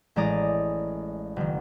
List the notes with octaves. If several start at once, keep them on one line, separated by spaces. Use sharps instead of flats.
A1 G#3 D5 A#5 D#6
F#1 D#3